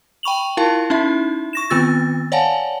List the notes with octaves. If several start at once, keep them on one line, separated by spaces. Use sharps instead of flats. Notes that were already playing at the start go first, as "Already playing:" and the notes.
G5 B5 C#6 F7 F#7
E4 F4 A#4 F5 A5
C#4 D#4 E4 E5
C#6 A#6 E7
D#3 B3 C4 F4 E6 A6
C#5 D5 F5 F#5 G#5 A5